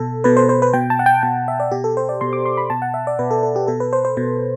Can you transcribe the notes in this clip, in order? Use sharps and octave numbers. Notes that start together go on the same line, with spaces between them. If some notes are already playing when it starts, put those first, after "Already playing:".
Already playing: B2 A4
B2 B4
C5
C5
B4
B2 G5
A5
F#5
G5
B2 G5
E5
D5
B2 G4
A4
C5
D5
B2 C6
D6
C6
B5
B2 A5
F#5
E5
D5
B2 B4
A4
A4
G4
B2 A4
B4
C5
C5
B2